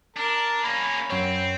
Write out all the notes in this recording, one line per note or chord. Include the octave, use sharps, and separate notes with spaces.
D4 A#4
A#3 C#4 B5
F#2 C4 C#5